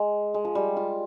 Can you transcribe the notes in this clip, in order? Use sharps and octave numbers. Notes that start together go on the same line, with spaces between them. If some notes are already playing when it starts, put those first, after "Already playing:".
Already playing: G#3
G#3
F3
G3
F4